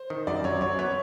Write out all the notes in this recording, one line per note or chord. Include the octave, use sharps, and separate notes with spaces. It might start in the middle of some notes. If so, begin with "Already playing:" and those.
Already playing: C5
D#3
F#2 D5
F#2 C#5
F#2 C#5
B3 C#5